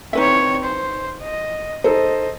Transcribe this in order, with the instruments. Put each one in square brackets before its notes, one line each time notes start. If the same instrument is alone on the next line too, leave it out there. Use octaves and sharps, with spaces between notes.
[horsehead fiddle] C4 C#5 [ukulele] D#4 B4 E5
[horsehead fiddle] C5
D#5
[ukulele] D#4 [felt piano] A4 C5 [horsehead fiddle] D#5